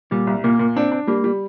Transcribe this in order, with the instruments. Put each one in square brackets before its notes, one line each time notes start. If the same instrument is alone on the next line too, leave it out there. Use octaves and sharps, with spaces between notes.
[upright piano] A#2 [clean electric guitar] G3
[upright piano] C2
[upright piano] A#2 [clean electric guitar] A#3
[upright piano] A#2
[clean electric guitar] C4 [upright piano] D4
[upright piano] D4
[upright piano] G3 [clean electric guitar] A#3
[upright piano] G3